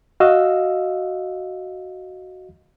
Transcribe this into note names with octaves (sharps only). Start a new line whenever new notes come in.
F#4 D#5 F5 E6